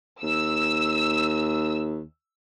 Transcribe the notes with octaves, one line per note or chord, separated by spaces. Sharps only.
D#2 E6